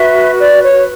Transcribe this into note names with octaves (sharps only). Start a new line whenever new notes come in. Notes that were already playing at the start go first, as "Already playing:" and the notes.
Already playing: F#4 B4 E5
D5
C#5